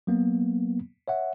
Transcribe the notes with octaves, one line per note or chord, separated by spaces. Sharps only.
F#3 A#3 B3
C#5 E5 F#5